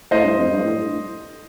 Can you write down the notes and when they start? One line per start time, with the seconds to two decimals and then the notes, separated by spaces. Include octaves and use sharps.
0.11 A2 C5 D#5
0.24 G2
0.38 F2
0.51 G2
0.64 A2